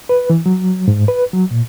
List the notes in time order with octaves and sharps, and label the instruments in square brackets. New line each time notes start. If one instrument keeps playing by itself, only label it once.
[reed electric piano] B4
E3
F#3
G#2
B4
F#3
A#2